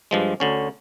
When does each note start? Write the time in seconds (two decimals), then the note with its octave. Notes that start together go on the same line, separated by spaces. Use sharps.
0.11 G2 F3 G#3
0.40 D2 D3 C#4